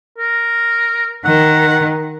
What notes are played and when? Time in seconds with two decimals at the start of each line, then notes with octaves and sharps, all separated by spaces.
0.18 A#4
1.25 D#3 F#5